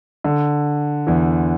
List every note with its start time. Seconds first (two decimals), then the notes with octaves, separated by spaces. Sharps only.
0.24 D3
1.07 E2 E3